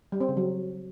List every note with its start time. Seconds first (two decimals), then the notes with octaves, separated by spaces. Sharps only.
0.12 G3
0.20 C4
0.29 C#3
0.37 F#3